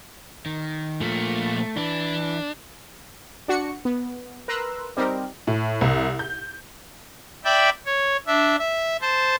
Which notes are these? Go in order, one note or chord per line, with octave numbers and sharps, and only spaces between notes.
D#3
A#2 F3 A3
E3 D4 B4
D4 F#4 C#7
B3
A#4 B4 A#5 C6 E6 F#6
G3 C4 D#4 G4 A#4
A2
C2
G6
D5 E5 G5 B5
C#5
D4 E5
E5
C5 A5